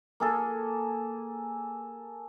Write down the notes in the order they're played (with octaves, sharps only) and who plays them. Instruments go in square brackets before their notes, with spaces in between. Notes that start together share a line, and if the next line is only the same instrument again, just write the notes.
[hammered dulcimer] A#3 G#4 A4